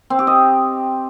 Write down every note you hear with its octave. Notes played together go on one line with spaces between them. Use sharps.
C4
G4
D#5